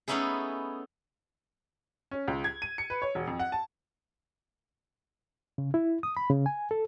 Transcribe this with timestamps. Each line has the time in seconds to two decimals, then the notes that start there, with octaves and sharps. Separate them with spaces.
0.08 A3 B3 C#4 D#4 E4 G#4
2.11 C#4
2.28 C#2
2.44 G#6
2.62 D#7
2.78 C#7
2.90 B4
3.02 C#5
3.15 E1
3.27 F2
3.39 F#5
3.52 A5
5.58 C#3
5.74 E4
6.03 D#6
6.17 B5
6.30 C#3
6.46 G#5
6.71 A4